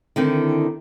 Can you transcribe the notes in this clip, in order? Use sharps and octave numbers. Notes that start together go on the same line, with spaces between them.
D3 D#3 C4 E4